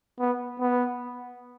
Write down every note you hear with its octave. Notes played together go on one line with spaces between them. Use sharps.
B3
B3